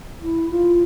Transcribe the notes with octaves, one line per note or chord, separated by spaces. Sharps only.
E4
F4